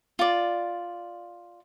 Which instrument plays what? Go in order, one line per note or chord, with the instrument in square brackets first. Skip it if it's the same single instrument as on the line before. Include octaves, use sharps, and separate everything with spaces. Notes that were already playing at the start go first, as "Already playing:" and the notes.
[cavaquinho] F4 D5